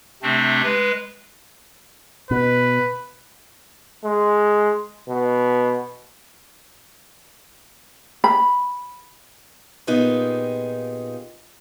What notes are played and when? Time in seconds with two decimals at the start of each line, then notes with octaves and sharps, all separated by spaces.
0.23 C3 A3 C4 D4
0.63 G#3 B4
2.31 B2 B4
4.04 G#3
5.08 B2
8.24 B5
9.87 A#2 B3 D#4 F4 G4 G#4